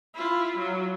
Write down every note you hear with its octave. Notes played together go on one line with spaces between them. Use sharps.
E4 F4
F#3